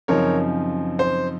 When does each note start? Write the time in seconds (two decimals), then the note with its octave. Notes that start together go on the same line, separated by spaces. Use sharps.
0.08 F#2 C#3 F3 C4 D#4 A#4 C#5
0.99 C5